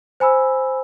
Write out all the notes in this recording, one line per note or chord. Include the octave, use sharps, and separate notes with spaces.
C5 G#5 B5 E6